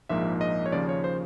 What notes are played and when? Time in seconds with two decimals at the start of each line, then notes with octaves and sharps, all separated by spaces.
0.09 A#1 G#2 F3 A#3 E5
0.41 D#5
0.66 C#5
0.72 D#2 C#3 F3 D5
0.89 C#5
1.04 C5